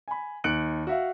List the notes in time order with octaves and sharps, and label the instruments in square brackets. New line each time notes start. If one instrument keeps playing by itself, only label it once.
[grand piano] G#5 B5
D#2 F#6 C#7 D7 F#7
F#4 E5 F5